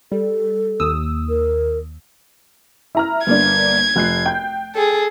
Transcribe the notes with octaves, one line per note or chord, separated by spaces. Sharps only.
G3 A4
D#2 D#6 E6
A#4
E4 A#5 F6
G1 A#3 D4 G#6
F1 F#6 C7
G5 G6
G#4 A4